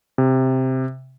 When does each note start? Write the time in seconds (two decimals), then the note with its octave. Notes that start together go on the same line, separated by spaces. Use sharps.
0.18 C3